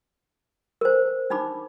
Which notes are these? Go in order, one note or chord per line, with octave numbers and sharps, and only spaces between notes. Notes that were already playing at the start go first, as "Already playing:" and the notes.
A#4 C5
D4 D#4 B5 D6